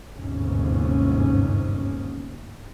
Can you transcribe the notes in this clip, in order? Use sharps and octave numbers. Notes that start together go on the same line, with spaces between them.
G1 D#2 G#2 C3 C#4